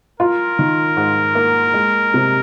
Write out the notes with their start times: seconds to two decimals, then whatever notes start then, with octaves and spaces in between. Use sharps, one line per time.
0.20 F4 A#4
0.59 D#3
0.97 G#2
1.35 A#3
1.74 G#3
2.14 C3